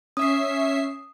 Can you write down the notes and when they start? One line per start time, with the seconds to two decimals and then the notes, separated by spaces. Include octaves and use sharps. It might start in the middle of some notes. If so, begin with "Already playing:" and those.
0.17 C#4 E5 D#6 C7